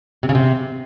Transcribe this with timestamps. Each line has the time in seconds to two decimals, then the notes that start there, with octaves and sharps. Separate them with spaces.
0.23 C3
0.29 C#3
0.35 C3